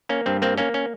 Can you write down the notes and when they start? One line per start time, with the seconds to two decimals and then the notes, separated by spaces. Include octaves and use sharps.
0.09 A#3 C#4
0.26 G2 C4
0.42 A#3 C4
0.58 A#3 C#4
0.74 C#4